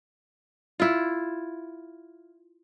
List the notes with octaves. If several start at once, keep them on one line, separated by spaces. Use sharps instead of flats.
E4 F4